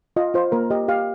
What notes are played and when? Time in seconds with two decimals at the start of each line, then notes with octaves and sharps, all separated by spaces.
0.16 F4 D#5
0.34 F4 C5
0.52 A#3 A#4
0.70 G4 D#5
0.88 G4 F5